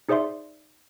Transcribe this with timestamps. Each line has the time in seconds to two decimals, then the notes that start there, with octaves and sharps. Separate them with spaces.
0.09 D#4 G#4 C5 D5 E5 C6